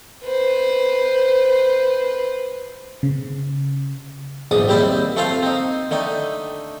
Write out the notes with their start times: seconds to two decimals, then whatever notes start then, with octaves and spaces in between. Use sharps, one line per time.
0.24 B4 C5
3.03 C#3
4.51 A#1 E2 G#2 D6 D#6
4.68 D#2 G3 C4 E4 D5 G5
5.16 A3 C4 F4 A4 C5 F5
5.43 C4 D#4
5.91 D3 A3 D#4 G5